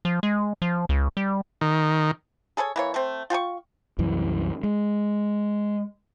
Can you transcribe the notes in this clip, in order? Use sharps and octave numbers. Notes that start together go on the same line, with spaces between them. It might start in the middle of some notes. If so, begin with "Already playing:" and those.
F3
G#3
F3
C#2
G3
D#3
G#4 A4 B4 C#5
E3 A#3 C#5
A3 C4
F4 G5 G#5 C#6
C2 F#2 E3
G#3